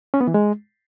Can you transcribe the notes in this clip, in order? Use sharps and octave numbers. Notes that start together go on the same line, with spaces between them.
C#4
B3
E3
G#3